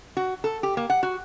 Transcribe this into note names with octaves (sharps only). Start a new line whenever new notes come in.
F#4
A4
G4
A#3
F#5
F#4